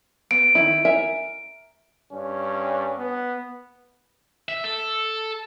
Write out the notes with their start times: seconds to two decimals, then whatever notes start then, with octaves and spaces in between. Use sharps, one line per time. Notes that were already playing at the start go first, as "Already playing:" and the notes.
0.31 B3 D7
0.55 D#3 F#3 E4
0.85 A#4 E5 G#5
2.13 G2 C#4
2.98 B3
4.49 E5
4.64 A4